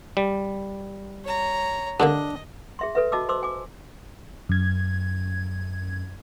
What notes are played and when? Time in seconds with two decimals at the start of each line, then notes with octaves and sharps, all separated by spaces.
0.17 G3
1.25 C#5 A#5
2.00 G2 D3 A#3 D4 D#5
2.79 G#4 E5 C6
2.95 A4 B4 E5
3.12 F#4 D#5 A5 D6 E6
3.29 C5 C6 D6 E6
3.43 G#5 D6
4.49 F#2 G#6